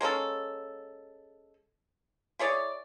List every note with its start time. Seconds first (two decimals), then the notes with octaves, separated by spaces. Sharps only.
0.01 G#3 A#3 C#4 A4
2.39 E4 G#4 C#5 D5